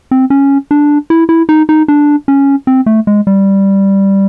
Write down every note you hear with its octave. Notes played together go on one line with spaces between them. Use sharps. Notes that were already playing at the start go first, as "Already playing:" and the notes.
C4
C#4
D4
E4
E4
D#4
D#4
D4
C#4
C4
A3
G#3
G3